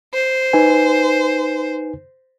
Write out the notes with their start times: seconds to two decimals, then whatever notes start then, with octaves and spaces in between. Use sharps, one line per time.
0.14 C5
0.53 D#4 B4 G#5